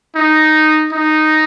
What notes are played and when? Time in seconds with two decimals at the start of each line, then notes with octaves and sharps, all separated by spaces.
0.15 D#4
0.92 D#4